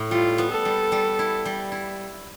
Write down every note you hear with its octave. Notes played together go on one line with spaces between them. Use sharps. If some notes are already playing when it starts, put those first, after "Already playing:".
Already playing: A2 E4
G3 F4
B3
A4
G3
G3
E4
G3
E4